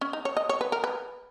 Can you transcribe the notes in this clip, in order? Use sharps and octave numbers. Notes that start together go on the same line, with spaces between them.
C#4
D#4
C#5
D#5
C#5
B4
A#4
B4